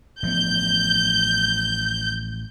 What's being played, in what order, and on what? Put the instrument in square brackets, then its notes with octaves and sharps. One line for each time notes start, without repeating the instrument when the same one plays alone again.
[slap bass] A1 F3 B3 [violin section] G6